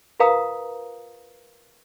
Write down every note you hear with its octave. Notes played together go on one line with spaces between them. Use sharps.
F4 A#4 B4 F5 A#5 D#6